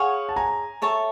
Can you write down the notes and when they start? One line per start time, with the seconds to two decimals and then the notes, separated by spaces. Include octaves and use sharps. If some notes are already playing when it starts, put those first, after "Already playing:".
Already playing: G#4 C#5 F5 F#5 G#5
0.29 A5
0.36 G#5 A#5
0.82 A4 C#5 E5 A5